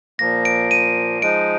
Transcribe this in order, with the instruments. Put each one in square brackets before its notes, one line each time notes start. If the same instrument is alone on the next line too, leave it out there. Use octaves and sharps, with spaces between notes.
[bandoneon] A#2 F3 A#3 [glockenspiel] A#6
[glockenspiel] D7
D#7
[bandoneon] F3 G#3 D#4 [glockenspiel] D7